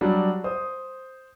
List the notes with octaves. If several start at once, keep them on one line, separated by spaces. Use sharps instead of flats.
F#3 G3 D4
C5 D#6